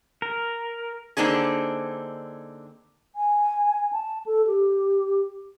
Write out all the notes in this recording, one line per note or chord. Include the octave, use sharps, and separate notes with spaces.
A#4
D3 A#3 C4 D4 D#4 G#4
G#5
A5
A4
G4